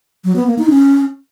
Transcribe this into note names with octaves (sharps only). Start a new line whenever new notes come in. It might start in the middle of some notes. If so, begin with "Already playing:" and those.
F#3
B3
A#3
D#4
C#4